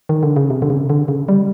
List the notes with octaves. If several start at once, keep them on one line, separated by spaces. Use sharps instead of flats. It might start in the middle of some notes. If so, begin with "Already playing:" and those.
D#3
D3
C#3
C3
D3
C#3
D3
C#3
G3